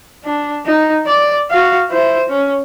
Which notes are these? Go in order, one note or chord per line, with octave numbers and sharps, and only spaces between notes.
D4
D#4
D5
F#4 F5
E4 C5
C#4